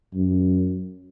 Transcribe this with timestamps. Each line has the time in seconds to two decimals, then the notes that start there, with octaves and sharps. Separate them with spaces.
0.14 F#2